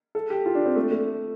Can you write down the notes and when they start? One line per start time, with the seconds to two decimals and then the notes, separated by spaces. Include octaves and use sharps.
0.15 A4
0.30 G4
0.46 F4
0.55 D4
0.66 C4
0.76 A3
0.91 A3